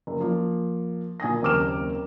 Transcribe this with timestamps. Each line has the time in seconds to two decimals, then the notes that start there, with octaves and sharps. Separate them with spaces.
0.07 F#1
0.20 F3 A#3
1.20 A#2 G#5 D#6 A#6
1.42 F#1 D#2 C4 D6 F6 E7